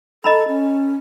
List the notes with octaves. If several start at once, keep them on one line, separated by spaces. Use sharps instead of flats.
A4 D#5 A#5 B5
C#4